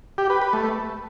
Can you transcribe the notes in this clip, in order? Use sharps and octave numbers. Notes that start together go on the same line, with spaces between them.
G4
B4
B4
A3